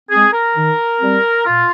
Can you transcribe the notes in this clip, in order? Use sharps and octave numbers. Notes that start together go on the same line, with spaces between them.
G#3 C4 G#4
A#4
D#3
G3 C4
A#2 F4